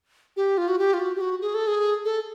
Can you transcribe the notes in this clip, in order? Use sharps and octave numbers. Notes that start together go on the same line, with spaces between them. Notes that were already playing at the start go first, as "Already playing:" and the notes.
G4
F4
F#4
G4
F4
F#4
G4
F#4
G#4
A4
G#4
A4